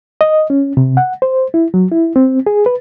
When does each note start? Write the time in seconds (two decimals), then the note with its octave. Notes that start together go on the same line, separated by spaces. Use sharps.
0.21 D#5
0.50 C#4
0.77 C3
0.97 F#5
1.22 C5
1.54 E4
1.74 F#3
1.91 E4
2.16 C4
2.47 G#4
2.66 B4